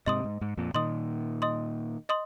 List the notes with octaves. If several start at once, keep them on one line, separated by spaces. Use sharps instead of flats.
G#2 C3 D#5 C6 D#6
G#2
G#2
F2 A#2
A#2 D#3 D#5 C6 D#6
D#5 C6 D#6
D#5 C6 D#6